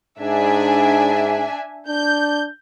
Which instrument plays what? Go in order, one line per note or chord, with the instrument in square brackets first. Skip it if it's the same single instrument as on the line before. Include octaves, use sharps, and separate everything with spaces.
[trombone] G#2 [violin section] D4 E5 G#5
[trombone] D4 [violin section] G6